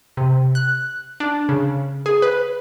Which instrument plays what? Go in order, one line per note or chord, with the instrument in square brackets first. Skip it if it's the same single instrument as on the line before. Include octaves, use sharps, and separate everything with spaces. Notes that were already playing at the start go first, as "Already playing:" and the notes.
[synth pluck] C3
F#6
D4
C#3
G#4
B4